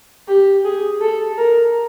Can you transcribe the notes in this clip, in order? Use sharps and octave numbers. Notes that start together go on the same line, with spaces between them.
G4
G#4
A4
A#4